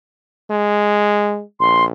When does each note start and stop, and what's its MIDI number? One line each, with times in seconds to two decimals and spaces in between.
0.50 1.42 56
1.60 1.92 34
1.60 1.84 84